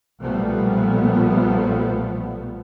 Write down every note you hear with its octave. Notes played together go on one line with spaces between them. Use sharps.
B1 A#2 F3 G3 A3 B3